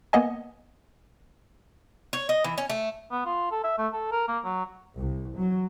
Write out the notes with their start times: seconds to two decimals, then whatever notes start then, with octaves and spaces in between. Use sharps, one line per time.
0.13 A#3 B3 D#5 G#5
2.13 C#5
2.29 D#5
2.44 E3
2.58 C#4
2.70 A3
3.11 B3
3.25 F4
3.51 A4
3.64 E5
3.78 A3
3.93 A4
4.12 A#4
4.28 A#3
4.45 F#3
4.97 C2
5.37 F#3